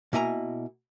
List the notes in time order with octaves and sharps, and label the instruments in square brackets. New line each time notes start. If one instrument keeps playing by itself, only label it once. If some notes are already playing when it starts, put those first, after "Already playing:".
[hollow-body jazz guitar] B2 A#3 E4 D#5 G#5 A#5